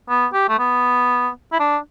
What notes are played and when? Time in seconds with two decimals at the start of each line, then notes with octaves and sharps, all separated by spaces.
0.09 B3
0.33 G4
0.49 A3
0.59 B3
1.53 E4
1.60 D4